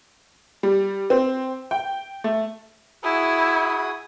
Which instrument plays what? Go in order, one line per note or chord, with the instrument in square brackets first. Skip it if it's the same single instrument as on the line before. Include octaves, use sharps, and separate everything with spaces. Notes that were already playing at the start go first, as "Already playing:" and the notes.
[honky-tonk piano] G3
C4
G5
A3
[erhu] E4 [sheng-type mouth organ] F#4 G#4 D#6